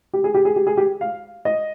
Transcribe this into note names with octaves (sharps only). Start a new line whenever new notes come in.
G4
G#4
G4
G#4
G4
G#4
G4
F5
D#5